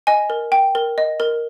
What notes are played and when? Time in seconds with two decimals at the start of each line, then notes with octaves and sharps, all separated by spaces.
0.07 D#5 G#5
0.30 A#4
0.52 G5
0.75 A#4
0.98 D#5
1.20 A#4